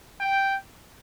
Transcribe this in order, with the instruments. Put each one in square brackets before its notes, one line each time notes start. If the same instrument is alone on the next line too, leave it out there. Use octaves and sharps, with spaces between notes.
[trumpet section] G5